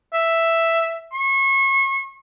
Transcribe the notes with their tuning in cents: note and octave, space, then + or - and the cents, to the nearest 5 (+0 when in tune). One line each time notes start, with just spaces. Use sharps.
E5 +5
C#6 -35